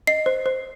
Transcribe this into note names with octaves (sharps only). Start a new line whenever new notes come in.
D#5 C7
C5
C5